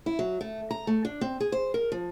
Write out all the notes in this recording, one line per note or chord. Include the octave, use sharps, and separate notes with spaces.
E4
F#3
A3
A#5
A3
D4
C4
G#4
C5
A#4
F3